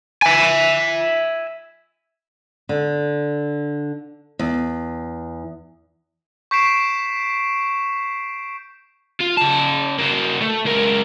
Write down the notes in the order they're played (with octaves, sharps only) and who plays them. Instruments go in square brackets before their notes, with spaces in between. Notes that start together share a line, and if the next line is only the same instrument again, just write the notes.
[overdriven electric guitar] E5 G#5
[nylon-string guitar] D3
E2
[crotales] C#6 G6 B6 C7 D7 E7
[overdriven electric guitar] F4
C#3 A5
A#3 F#4
A3
C#2 A#4